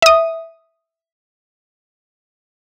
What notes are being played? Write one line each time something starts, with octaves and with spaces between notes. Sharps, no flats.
E5 D#6